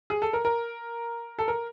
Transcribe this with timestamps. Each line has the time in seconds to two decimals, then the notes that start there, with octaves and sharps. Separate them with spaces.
0.10 G#4
0.22 A4
0.33 A#4
0.45 A#4
1.39 A4
1.48 A#4